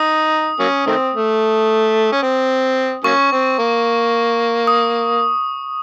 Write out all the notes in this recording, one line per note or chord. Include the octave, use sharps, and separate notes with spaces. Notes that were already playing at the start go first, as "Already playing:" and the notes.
Already playing: D#4 D#6
F#3 A#3 C#4
D#3 A3 C4
A3
C#4
C4
F#3 A#3 C#4 C#6
C4
A#3
D#6